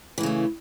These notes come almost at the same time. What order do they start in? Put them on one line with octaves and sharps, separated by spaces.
E3 A#3 C#3 A3